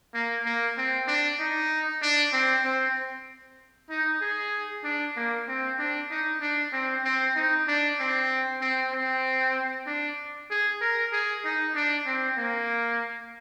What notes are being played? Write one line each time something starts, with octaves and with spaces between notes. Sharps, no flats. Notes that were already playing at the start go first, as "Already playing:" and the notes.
A#3
A#3
C4
D4
D#4
D4
C4
C4
D#4
G#4
D4
A#3
C4
D4
D#4
D4
C4
C4
D#4
D4
C4
C4
C4
D4
G#4
A#4
G#4
D#4
D4
C4
A#3